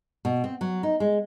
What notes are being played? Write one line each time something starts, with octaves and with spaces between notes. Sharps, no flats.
B2
C4
F#3
D#4
G#3